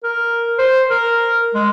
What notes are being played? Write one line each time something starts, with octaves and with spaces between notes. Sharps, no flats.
A#4
C5
A#4
G#3